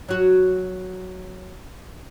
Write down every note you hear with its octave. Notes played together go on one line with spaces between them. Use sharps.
F#3 F#4